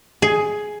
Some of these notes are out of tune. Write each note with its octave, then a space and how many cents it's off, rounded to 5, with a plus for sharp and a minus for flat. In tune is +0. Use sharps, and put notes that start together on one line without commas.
G#4 +10